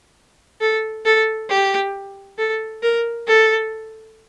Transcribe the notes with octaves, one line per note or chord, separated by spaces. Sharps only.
A4
A4
G4
A4
A#4
A4